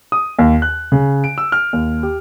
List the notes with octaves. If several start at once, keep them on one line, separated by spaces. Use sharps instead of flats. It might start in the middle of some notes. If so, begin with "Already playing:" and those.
D#6
D#2
F#6
C#3
D7
E6
F6
D#2
G4